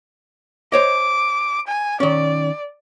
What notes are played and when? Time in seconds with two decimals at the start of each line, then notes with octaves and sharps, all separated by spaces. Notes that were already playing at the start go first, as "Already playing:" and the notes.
0.72 C5 C#5 D#5 D6
1.67 G#5
2.00 D#3 C#4 D5